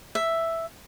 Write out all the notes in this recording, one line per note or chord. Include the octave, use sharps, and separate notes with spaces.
E5